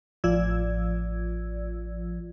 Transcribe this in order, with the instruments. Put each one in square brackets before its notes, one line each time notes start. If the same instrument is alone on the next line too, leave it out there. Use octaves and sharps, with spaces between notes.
[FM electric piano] A1 F3 F4 D5 E6 G#6